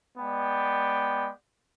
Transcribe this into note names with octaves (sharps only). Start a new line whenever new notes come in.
G#3 B3 D5 G5